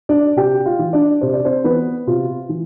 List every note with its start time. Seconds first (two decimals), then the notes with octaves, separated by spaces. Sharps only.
0.09 D4 D5
0.36 C3 G4 G5
0.66 F4 F5
0.79 E3
0.93 D4 D5
1.21 C3 C5
1.33 D5
1.45 C4 C5
1.64 E3 B3 B4
2.07 C3 F4
2.49 E3